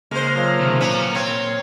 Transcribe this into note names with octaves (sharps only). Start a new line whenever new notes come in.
C#3 G#3 A#3 C5 F6
F3 F#3
C3 D#3
A#2 B3 C#4 A#5
C4 C#5